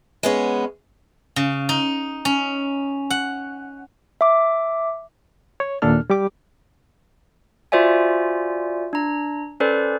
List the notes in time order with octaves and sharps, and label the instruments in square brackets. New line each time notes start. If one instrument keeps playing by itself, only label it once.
[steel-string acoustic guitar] G#3 B3 C#4
[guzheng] C#3
D#4
C#4
F#5
[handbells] E5 D6
[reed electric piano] C#5
D#2 A#2 D4 A4 F6
G3 G4 D6
[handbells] F4 F#4 C5 D5 E5 G#5
D4 A#5
C#4 A4 B4 C5 D5